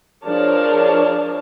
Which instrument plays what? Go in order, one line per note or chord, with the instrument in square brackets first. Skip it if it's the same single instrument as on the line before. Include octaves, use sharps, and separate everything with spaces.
[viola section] F3 D4 G#4 A#4 C#5 A5